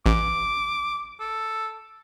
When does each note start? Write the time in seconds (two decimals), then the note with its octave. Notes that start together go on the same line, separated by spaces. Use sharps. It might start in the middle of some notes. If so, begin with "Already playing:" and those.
0.06 A1 D6
1.20 A4